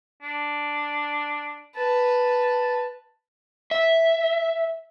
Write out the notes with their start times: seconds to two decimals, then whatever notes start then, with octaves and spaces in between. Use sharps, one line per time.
0.23 D4
1.76 B4 A5
3.71 E5